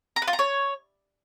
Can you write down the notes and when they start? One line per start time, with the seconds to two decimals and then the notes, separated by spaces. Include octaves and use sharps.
0.16 A#5
0.22 B4
0.28 F4
0.33 A#5
0.39 C#5